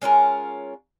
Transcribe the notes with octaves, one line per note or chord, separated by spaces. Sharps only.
G#3 C#4 F4 A#4